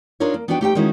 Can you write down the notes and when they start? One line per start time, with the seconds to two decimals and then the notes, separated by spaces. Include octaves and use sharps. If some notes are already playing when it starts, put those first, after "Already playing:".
0.20 D4 D#4 F4 A#4 C#5
0.34 A#3
0.48 B3 D4 D#4 F#4 B4 G5
0.61 A3 D#4 G4 C5 E5 G5
0.75 D#3 G#3 C#4 D#4 E4 F#4